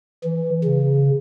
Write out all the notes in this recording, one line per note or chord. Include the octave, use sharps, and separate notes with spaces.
E3
C#3